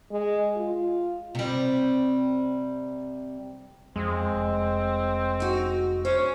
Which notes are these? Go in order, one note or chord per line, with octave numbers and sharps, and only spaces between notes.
G#3
F4
C3 G3
F2 G#3 C4
F1
D#4 F#4
C#4 C5